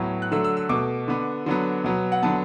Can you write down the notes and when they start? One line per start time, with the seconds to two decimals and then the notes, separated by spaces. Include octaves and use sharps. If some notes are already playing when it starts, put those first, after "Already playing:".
Already playing: A2 F#3 B3
0.22 F#6
0.32 D3 F#3 A3 E6
0.44 E6
0.57 E6
0.69 B2 A3 D6
1.08 D3 B3
1.46 D3 F#3 B3
1.84 B2 F#3 B3
2.12 F#5
2.23 D3 F#3 B3 A5